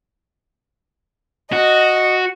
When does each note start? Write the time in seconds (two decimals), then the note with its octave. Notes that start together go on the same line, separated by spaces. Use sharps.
1.52 F#4 D#5